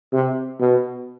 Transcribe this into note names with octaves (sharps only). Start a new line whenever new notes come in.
C3
B2